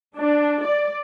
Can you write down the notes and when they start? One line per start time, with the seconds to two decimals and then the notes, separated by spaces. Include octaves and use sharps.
0.18 D4
0.64 D5